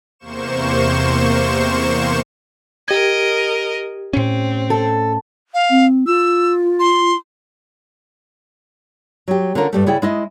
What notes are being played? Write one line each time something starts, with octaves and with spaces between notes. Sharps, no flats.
E2 C3 A#3 C5 C#6 E7
G4 A#4 D#5 G#6
A2 C4 C#4
A4
F5
C4
F4 E6
C6
F#3 G4
D3 C#4 F4 A#4
G2 G3 A3
C#3 E4 G#4 D5 G5
G#3 E4 D#5